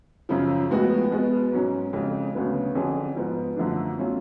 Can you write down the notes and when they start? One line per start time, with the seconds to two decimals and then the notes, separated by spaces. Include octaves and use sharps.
0.29 F#2 C#3 F3
0.70 A2 F3 G#3 B3 F#4
1.11 B2 G#3 B3
1.52 G#2 F#3 C#4
1.93 F2 C#3 G#3
2.34 D2 C#3 F#3 B3
2.75 F2 D3 F#3 C#4 G#4
3.16 G#2 F3 B3 F4
3.56 F#2 D3 F3 A3 D4
3.98 B2 F#3 A3 C#4 F4